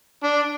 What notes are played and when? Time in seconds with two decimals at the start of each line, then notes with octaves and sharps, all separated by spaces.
0.24 D4